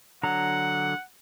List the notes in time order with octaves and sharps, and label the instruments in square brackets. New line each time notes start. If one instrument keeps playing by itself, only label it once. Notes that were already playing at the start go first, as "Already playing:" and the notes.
[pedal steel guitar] D3 F#3 A#5 [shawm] F#5